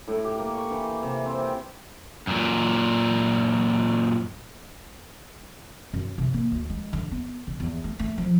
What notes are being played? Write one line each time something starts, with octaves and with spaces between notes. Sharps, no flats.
A2
G4
A#3
C#6
E3
C3
C4
G5
F#2 A#2
F#2
C3
A#3
D2
G#3
D3
B3
C#3
E2
A3
A3
F3